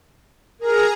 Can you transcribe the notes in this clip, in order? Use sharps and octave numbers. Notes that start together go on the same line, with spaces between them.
G#4 A#4 A#5